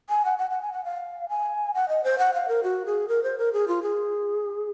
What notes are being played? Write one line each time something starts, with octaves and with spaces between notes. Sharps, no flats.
G#5
F#5
F#5
F#5
G#5
F#5
F5
G#5
F#5
D#5
C5
F#5
F5
A#4
F#4
G#4
A#4
C5
A#4
G#4
F4
G#4